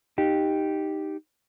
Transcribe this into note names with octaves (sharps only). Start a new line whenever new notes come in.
D#4 G4